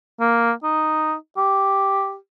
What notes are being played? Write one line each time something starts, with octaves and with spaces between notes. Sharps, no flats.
A#3
D#4
G4